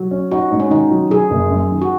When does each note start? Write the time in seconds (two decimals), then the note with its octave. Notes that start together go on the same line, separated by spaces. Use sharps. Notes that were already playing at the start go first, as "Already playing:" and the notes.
Already playing: F#3
0.11 C#4
0.31 D#4 F#4
0.51 G#2
0.60 C#4
0.70 D#3 D#4
0.91 F#3
1.10 F#3 G#4
1.30 F#1
1.50 F#2
1.71 D#3
1.82 F#4